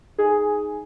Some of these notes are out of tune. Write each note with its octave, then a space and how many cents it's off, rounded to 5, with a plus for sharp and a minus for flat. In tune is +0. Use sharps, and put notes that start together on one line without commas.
D#4 -5 G#4 +5 G#5 +0